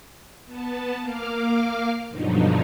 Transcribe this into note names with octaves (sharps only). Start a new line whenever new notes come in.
B3 A5
A#3 F5 D6 F6
G2 B2 D3 F3 F#3 D#4